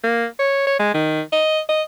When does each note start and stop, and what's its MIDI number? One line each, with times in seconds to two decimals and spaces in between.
0.04 0.26 58
0.39 0.66 73
0.67 0.77 73
0.79 0.92 56
0.94 1.21 51
1.32 1.60 75
1.69 1.82 75